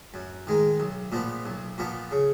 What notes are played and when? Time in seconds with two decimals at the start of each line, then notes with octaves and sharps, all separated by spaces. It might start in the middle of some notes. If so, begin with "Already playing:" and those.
0.14 F#2
0.47 D#3 G#3 D#4
0.80 B1
1.12 A#2 F3 B3
1.46 B1
1.78 A#2 F3 B3
2.11 C#3